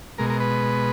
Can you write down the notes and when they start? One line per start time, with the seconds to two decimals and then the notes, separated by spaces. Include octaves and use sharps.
0.18 B2 G#3 A#4
0.30 A#4
0.40 B4